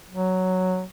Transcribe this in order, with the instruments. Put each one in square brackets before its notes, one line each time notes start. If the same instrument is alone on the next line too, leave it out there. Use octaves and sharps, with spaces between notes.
[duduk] F#3